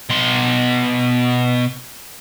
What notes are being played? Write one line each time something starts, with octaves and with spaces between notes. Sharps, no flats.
B2 C6